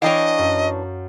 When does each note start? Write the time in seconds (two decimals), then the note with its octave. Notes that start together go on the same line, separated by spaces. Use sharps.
0.02 E3 D4 C#5 D#5 F5 G5
0.38 F#2